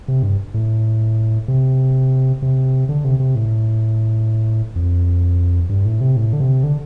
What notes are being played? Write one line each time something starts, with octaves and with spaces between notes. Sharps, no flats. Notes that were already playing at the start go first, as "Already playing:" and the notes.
C3
G2
A2
C3
C3
D3
C3
C3
A2
F2
G2
A2
C3
A2
D3
C3
D3